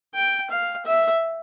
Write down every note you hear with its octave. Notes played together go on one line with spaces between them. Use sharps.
G5
F5
E5